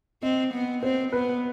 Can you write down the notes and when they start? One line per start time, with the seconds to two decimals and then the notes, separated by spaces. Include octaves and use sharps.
0.23 C4 D#5
0.53 B3
0.83 C4 C5
1.12 B3 B4